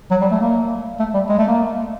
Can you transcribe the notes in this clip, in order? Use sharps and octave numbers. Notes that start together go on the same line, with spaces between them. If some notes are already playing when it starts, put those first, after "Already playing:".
F#3
G3
A3
A#3
A3
G3
G#3
A3
A#3